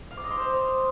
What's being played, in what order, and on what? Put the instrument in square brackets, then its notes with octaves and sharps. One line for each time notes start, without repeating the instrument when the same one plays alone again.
[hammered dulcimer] F5
D6
D#5
C6
C5